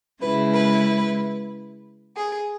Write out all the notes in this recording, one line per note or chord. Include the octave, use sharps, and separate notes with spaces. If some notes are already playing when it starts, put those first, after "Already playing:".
C#3 G#3 E4 B4
B4
G#4